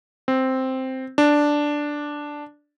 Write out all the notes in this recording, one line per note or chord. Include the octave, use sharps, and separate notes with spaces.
C4
D4